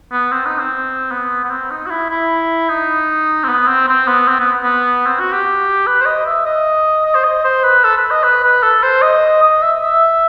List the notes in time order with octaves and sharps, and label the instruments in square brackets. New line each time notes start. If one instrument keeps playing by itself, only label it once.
[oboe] B3
C4
D#4
C4
B3
B3
C4
D#4
F#4
E4
E4
D#4
C4
B3
C4
C4
B3
C4
B3
B3
C4
F#4
G4
B4
C5
D#5
E5
D#5
D#5
C5
D#5
C5
B4
A4
B4
D#5
B4
B4
A4
C5
D#5
D#5
E5
E5